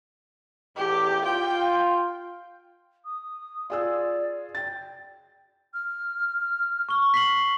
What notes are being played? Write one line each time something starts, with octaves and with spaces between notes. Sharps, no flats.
A1 E2 G4
F4 G5
D#6
F4 G#4 D5 E6
G5 A6
F6
C#6 G7
B6 C7 F#7